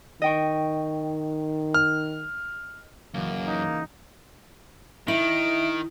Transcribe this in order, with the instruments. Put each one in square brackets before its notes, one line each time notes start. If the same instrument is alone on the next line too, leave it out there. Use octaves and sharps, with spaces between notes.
[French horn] D#3 [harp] D#5 G5 C#6
[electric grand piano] F6
[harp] C#2 E3 [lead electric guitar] F#2 [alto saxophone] A#3
[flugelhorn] D#4 [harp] F#4
[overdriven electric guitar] D#3 [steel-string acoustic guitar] E4 [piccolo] D7